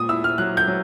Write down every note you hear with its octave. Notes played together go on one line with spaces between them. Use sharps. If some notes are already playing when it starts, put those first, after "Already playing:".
Already playing: A#2 D#6
E4 E6
F6
F#3 F#6
G6
F#3